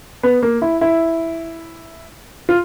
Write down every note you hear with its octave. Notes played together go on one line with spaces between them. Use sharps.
B3
A#3
E4
E4
F4